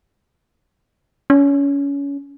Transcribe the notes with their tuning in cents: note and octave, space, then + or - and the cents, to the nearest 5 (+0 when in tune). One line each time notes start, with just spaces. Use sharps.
C#4 +25